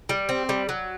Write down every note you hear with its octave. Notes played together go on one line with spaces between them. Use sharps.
G3
C4
G3
F#3